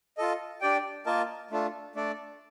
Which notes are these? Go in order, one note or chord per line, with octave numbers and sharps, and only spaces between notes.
F4 A4 D#5
D4 G4 D5 G5
A#3 F4 A#4 D#5 A5
A3 D4 F4 A4
A3 D4 A4 D5